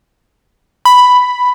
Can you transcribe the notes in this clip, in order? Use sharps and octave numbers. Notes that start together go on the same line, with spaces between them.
B5